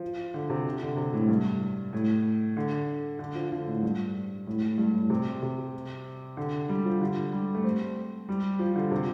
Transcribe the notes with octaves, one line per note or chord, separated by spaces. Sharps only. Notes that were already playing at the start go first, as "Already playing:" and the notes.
Already playing: F3
D3
C3
D3
C3
A2
G2
A2
D3
D3
F3
D3
A2
G2
A2
A2
G2
A2
C3
C3
D3
G3
F3
D3
G3
A3
C4
G3
F3
D3
C3